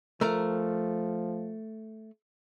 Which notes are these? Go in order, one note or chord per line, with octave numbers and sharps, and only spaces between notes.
F3 A3 A#4